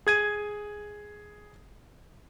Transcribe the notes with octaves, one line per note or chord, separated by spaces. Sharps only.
G#4 G#6 D#7